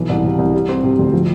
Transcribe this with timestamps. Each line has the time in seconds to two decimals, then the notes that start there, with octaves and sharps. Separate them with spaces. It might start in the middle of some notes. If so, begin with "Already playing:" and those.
Already playing: B1 E3
0.09 C2
0.23 C3
0.38 C2
0.53 G3
0.69 C4
0.83 C3
0.99 D2
1.13 F3